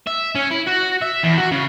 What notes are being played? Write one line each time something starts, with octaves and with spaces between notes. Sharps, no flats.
E5
C#4
E4
F#4
E5
E2
F#4
C#3